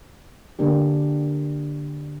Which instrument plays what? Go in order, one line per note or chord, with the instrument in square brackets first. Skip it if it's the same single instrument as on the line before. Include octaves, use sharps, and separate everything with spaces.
[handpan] D3 A#3 D4 G4